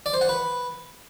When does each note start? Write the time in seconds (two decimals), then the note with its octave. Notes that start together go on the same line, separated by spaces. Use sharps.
0.06 D5
0.14 C5
0.21 F#5
0.29 B4